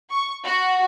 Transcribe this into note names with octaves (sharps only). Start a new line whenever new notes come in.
C#6
F#4